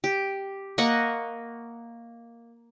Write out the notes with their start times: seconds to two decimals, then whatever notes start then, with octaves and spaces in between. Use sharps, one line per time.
0.04 G4
0.78 A#3 D#5 F#5 C#6